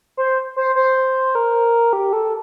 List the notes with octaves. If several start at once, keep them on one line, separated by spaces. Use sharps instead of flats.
C5
C5
C5
A#4
G4
A4